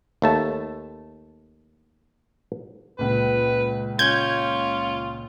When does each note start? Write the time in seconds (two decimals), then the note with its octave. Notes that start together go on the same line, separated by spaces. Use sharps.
0.22 D#2 A3 A5
2.99 C#2 A#2 B4
3.99 C#4 F4 G6 G#6